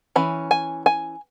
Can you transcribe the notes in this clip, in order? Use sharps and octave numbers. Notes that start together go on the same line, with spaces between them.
E3 C#4 B5
G#5
G#5